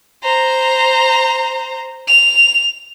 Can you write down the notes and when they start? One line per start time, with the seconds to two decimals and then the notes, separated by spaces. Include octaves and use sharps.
0.23 C5 A#5
2.08 F7